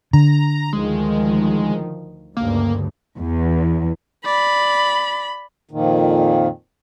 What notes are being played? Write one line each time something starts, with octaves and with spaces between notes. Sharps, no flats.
D3 A#5
D2 D#3 F3 G#3
D2 G2 C#3 A#3
E2
D5 B5
F2 A#2 D#3